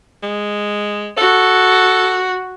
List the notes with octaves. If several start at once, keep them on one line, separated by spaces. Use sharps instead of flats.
G#3
F#4 A4